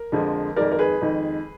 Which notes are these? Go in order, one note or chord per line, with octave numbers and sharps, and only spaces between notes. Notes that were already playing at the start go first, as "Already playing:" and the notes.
Already playing: A#4
F2 D3 F3 G#3
F2 D#3 G#3 A#4 D5
A#4
G#4 B4
F2 D#3 G#3